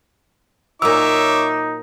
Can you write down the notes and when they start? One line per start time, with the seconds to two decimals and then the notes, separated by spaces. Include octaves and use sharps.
0.82 A#2 F#3 D#4 C#5 E5 D6 E6